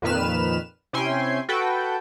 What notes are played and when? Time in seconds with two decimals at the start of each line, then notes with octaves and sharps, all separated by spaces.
0.02 F2 A#2 D#3 B4 F6 E7
0.93 C3 C#4 E4 G5 G#5 C6
1.49 F#4 A4 B4 G5